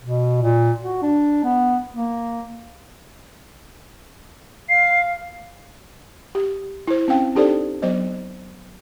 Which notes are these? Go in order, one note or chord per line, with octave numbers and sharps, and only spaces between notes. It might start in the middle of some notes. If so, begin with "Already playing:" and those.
B2
A#2
F#4
D4
B3
A#3
F5 C7
G4
E4 C5
C4 C#4 F5 G5
D4 D#4 G4 A4 C5 D5
F#3 B3 C5 D#5